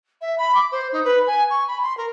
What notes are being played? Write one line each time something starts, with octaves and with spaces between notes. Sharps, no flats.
E5
B5
D6
C5
D#4
B4
G#5
C#6
B5
C6
A#4